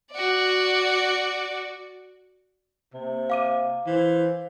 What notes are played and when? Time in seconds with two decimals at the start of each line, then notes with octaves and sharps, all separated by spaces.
0.11 F#4 D5
2.94 C3 A#3
3.30 F5 D6 D#7
3.86 E3 C5